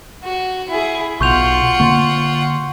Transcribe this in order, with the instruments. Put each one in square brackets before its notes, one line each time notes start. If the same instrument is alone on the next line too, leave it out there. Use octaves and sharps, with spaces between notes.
[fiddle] F#4
E4 G#4
[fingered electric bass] B1 B2 [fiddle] F4 F#5 [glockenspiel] C#6 G6 F7
[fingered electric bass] D3 A#3 [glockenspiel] C#6